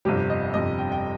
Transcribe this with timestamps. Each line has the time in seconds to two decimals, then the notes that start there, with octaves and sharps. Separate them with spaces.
0.05 G1 F2 C3 G3 G4
0.30 D#5
0.54 G1 F2 C3 G3 D#5
0.78 G5
0.92 G5